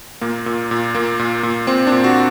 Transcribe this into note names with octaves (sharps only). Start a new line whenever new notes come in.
A#2 A#3
A#2
A#2
A#2 A#3
A#2
A#2
A#2 C4
D4
A#2
F#4